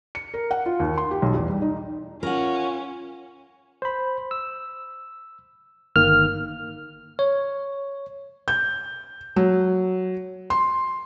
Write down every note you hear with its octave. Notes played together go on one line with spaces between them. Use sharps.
C#7
A#4
F#5
F4
D#2
C6
G4
B1
E2
G3
D#4
C#4 F4 A#4 F#5
C5 B5
E6
G1 D#3 A#3 F6
C#5
G6
F#3
C6